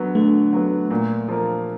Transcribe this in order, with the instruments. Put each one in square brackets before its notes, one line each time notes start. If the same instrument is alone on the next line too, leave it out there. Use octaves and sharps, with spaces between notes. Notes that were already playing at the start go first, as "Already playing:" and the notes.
Already playing: [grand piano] D3 F#3 B3
[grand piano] D3 [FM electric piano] A3
[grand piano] F#3 B3
A#2
F3 A#3